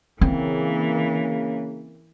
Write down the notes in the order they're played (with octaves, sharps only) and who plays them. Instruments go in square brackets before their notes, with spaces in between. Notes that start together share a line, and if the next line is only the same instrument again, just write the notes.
[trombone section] C#3 A#3 [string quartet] E3 [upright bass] C4